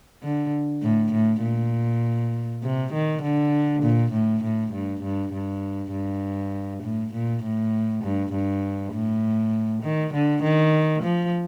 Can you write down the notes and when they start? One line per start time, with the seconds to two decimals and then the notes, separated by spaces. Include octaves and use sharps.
0.22 D3
0.82 A2
1.12 A2
1.42 A#2
2.63 C3
2.93 D#3
3.22 D3
3.83 A#2
4.12 A2
4.43 A2
4.73 G2
5.02 G2
5.33 G2
5.92 G2
6.83 A2
7.13 A#2
7.43 A2
8.03 G2
8.32 G2
8.93 A2
9.82 D#3
10.13 D3
10.42 D#3
11.02 F3